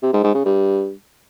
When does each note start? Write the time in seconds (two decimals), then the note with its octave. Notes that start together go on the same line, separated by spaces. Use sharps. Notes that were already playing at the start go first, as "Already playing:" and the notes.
0.03 C3
0.13 G#2
0.24 G#2
0.35 C#3
0.45 G2